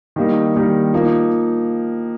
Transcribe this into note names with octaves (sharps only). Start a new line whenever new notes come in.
D#3 G3 A#3 D#4
D#3 G3 A#3 D#4
F3 A#3 D#4